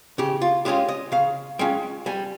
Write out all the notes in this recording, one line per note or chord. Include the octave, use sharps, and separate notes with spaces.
C#3 G4
F4
G#3 C#4 F4 G4
D#5
C#3 F5
G#3 C#4 F4 G5
G3 G#5